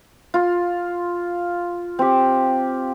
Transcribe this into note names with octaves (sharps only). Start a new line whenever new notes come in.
F4
C4 G4